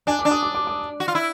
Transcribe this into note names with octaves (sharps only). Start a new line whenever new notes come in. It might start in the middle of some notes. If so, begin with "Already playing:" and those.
D4 G#5
D6
D4
D#6
D6
D6
D6
F#4
F4
E4